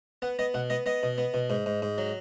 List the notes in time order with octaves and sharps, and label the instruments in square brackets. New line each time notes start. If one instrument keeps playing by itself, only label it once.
[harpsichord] B3 F#5
B3 D#5
B2 F#5
B3 D#5
B3 D#5
B2
B3
B2
G#2
G#2
G#2
F#3